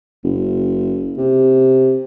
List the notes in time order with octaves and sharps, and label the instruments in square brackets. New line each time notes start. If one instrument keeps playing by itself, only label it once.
[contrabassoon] F#1
C3